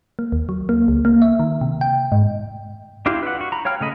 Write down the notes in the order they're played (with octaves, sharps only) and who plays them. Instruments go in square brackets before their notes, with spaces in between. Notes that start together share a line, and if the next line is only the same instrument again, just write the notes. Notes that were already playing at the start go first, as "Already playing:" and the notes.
[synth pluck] A#3
D#2
F#3
A#3
C#2
A#3
E5
D#3
C3
G5
G#2
[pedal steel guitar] D4 E4 F4 G4 F5
B4 F#5
F#4
A#5 B5
C#5 F5 G5 F6
C#3 A3 D#5 B5